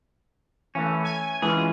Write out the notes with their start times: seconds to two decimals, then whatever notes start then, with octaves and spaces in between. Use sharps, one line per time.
0.75 E3 A3 C#4
1.03 G#5
1.42 E3 G#3 C#4 F4 G#4